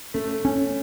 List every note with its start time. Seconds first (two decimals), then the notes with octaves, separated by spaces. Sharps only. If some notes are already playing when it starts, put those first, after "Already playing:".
0.14 A3 C#4
0.45 C#4